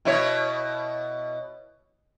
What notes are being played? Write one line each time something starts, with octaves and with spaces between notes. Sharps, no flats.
B2 E4 C#5